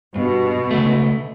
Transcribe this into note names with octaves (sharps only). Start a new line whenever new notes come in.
G2 B2
C#2 A3